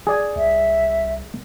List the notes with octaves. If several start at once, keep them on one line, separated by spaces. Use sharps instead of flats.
G#4 D5 G#5
C2 E5